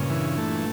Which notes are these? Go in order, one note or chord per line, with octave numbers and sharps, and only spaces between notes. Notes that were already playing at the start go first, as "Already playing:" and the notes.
Already playing: G2 A#2 C#3
E3
A3